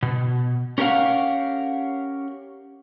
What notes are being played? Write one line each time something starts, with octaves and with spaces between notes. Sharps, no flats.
B2
C#4 G4 A#4 C#5 F5 F#5